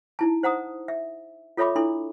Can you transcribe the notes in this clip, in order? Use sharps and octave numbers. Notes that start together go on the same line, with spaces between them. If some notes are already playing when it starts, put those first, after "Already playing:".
D#4 E4 A5
C5 F#5 A#5 D#6
E5
F4 A4 C#5 E5 B5 D6
D4 E4 A4 C6